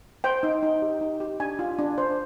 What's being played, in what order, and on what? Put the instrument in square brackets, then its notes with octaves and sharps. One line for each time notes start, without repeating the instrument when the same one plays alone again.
[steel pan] C5 G5
D#4
D#4
G4
D#4
G4
D4 G#5
F4
D4
C5